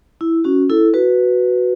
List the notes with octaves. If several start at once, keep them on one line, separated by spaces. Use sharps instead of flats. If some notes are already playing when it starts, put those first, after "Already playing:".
E4
C#4 F#4
E4 A4
F#4 B4